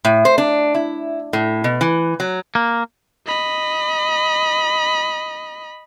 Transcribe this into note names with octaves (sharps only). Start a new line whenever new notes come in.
A2
C5
D4
E4
A2
B2
E3
F#3
A#3
D#5 B5